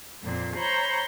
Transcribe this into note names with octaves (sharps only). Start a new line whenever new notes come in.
F2 A#2 C4
C5 C#5 A#5 B5 C#6 G6